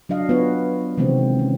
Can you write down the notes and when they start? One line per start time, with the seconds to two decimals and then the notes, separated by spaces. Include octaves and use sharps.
0.09 F#3 D4 D#5 F5
0.29 B3 D4 F4 C#5
0.98 C3 D#3 E3 G#3 C4
1.39 C#4